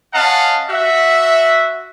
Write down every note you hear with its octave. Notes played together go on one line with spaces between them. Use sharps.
C#4 D#5 F5 F#5 A5
F#4 E5